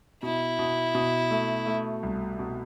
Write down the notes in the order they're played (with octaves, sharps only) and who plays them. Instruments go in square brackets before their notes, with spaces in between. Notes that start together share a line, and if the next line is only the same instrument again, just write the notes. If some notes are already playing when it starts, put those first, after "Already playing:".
[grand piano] B2 [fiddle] E4
[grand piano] B2
B2
A3
A3
C2
B2